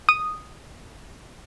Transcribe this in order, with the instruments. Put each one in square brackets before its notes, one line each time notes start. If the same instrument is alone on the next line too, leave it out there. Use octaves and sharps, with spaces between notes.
[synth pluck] D#6